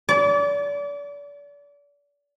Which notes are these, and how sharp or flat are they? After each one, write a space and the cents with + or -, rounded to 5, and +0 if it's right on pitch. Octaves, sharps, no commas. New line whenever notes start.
D5 -35